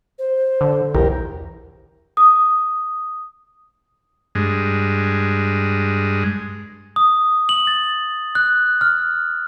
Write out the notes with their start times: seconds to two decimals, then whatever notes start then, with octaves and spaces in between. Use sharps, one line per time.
0.19 C5
0.61 D3
0.95 B1 E2 G4 A#4
2.17 D#6
4.35 G2 G#3
6.96 D#6
7.49 F#7
7.67 A6
8.35 F#6
8.81 F6